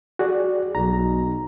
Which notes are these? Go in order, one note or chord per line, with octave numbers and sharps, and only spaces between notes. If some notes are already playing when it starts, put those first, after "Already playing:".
F#4 G#4 D5
B1 A#5